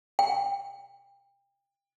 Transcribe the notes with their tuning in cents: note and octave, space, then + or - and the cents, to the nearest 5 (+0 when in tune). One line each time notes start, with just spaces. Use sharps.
G5 +30